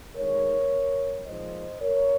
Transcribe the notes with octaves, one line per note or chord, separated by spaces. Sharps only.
D#3 G#3 D#4 A#4 C#5
A#2 F3 G#3 D#4 C5 D#5
A#4 C#5